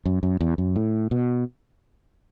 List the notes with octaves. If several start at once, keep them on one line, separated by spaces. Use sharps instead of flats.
F#2
F#2
E2
F#2
A2
B2